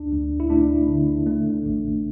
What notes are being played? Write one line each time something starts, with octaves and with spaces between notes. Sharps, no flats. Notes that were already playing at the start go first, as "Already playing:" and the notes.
Already playing: D2 D4
D2
E4
A3 D4
D3
A3
A1